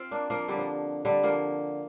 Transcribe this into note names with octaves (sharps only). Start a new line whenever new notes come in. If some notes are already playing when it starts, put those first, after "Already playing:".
Already playing: C4 F4
A#3 D4
F3 A#3
D3 G3
F3
D3 G3
F3 A#3